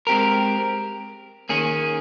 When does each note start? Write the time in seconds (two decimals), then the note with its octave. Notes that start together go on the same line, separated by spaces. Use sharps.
0.07 G#3 C4 G4 A#4
1.49 D#3 A#3 C#4 G#4